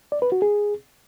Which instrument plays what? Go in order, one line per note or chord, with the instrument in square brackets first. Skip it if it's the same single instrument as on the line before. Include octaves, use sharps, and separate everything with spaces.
[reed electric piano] D5
B4
F#4
G#4